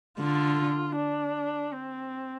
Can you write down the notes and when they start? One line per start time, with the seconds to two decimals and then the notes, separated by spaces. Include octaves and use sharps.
0.19 D3 F4
0.96 D4
1.73 C4